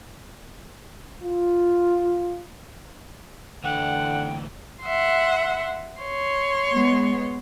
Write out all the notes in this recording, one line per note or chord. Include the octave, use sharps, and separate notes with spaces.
F4
D2 D3 E3 F#5 G5
E5 F#5 C6
C#5 C6
G#3 B3